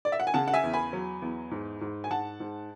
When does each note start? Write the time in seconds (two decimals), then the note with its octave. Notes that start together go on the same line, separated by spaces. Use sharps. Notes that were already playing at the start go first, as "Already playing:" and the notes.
0.05 D5
0.12 E5
0.20 F#5
0.27 G#5
0.34 C#3 F#5 A5
0.48 F#5
0.54 E5 G#5
0.63 E2
0.73 G#5 B5
0.93 F#3
1.22 E2
1.51 G#2
1.81 G#2
2.04 G#5
2.10 G#2 F#5 A5
2.40 G#2